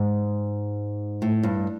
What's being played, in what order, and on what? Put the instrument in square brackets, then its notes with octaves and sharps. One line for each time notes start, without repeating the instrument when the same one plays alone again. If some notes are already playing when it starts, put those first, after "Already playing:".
Already playing: [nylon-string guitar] G#2
A2
G2